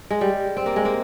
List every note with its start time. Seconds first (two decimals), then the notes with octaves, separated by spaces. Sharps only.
0.11 G#3
0.21 G3
0.57 C4
0.66 A#3
0.76 G#3
0.85 A#3